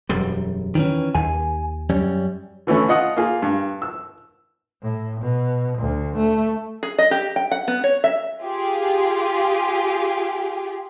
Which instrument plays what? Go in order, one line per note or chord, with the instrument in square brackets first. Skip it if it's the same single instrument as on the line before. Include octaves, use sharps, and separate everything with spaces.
[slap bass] E1 F#2 G3
[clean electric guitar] D#3 E3 C#4
[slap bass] D#2 [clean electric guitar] G#5
[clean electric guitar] F#2 G3 C#4
[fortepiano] D3 E3 A3 C#4 E4
F4 D#5 F#5 D#6
A#3 F4 G#4
G2
E6
[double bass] A2
B2
D2
A3
[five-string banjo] G#4
D#5
G4
G5
F#5
B3
C#5
E5
[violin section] F4 G4 G#4